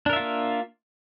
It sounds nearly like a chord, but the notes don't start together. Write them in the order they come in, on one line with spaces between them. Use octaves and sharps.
D4 A#4 E5 F4 A#3